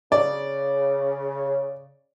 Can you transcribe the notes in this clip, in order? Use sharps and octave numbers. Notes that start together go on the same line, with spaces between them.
C#3 D5